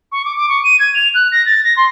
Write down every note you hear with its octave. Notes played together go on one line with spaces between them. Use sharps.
C#6
D6
D6
C#6
D#7
G#6
F7
F#6
A#6
A6
A#6
C6